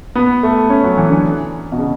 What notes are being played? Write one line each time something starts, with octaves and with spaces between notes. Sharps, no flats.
B3
A3
C#4
F#3
E3
D3
B2
C#3